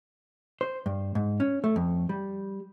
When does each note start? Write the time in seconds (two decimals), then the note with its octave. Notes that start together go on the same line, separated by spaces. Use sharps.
0.61 C5
0.86 G2
1.15 G#2
1.40 C#4
1.64 A3
1.76 F2
2.09 G3